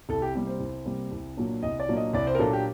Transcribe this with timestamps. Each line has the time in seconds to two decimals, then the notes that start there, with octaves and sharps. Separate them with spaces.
0.09 C2 A4
0.22 G4
0.35 C3 G3 A#3
0.47 C5
0.60 C2
0.85 C3 G3 A#3
1.12 C2
1.37 A#2 F#3 A#3 D4
1.63 C2 D#5
1.80 D5
1.88 A#2 F#3 A#3 D4
1.97 D#5
2.13 C2 D5
2.27 C5
2.35 A#4
2.39 A#2 F#3 A#3 D4 A4
2.53 G4